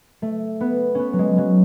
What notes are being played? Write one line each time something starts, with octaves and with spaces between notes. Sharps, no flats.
A3
B3
B3 C#4
F#3
G#3
F#3